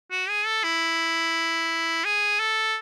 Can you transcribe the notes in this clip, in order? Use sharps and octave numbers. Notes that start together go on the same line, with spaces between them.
F#4
G#4
A4
E4
G#4
A4